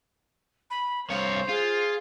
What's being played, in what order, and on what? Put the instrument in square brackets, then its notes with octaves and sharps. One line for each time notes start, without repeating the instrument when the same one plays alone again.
[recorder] B5
[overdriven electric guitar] C2 C#5 [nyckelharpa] C5 [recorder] F5
[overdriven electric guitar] F4 [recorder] G#4